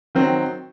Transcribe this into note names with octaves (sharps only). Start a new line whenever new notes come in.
D#3 F#3 C4